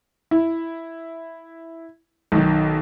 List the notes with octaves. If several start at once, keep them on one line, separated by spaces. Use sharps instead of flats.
E4
B1 D#3